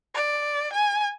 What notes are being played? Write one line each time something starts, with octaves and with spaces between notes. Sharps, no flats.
D5
G#5